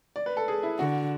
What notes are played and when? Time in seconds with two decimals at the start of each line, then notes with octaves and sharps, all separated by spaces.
0.16 D5
0.26 B4
0.37 A4
0.48 G#4
0.63 E4
0.79 D3 F#4